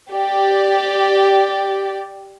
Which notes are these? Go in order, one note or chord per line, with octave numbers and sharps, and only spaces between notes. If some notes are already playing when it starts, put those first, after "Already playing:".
G4 D5